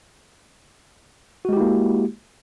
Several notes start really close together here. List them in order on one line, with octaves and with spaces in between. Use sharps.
F#4 G#3 G4 E4 A#3